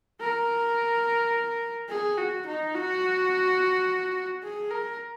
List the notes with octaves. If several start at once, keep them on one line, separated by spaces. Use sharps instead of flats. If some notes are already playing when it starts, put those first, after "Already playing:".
A#4
G#4
F#4
D#4
F#4
G#4
A#4